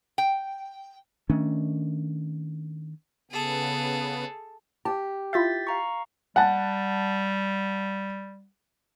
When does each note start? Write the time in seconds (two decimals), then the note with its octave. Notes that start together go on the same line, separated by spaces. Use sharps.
0.18 G5
1.30 D#3 A3 C#4 D4
3.31 C#3 B3 G#4 A4
4.85 G4 A5
5.33 E4 F4 E5 G6 A6 B6
5.67 F5 A#5 C#6
6.36 G3 F#5 A5